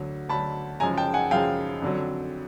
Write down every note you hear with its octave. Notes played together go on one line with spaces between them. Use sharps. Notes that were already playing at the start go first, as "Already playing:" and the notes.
Already playing: D2 D3 F#3
D2 D3 F#3 A5 B5
F#2 C#3 F3 G#3 G#5 A#5
G5 A5
F#5 G#5
F#2 C#3 F3 G#3 F5 G5
F2 D3 F#3